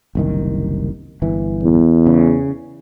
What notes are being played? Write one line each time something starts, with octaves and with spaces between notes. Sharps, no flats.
F#1 C2 D#3
G1 E3
E2
C#3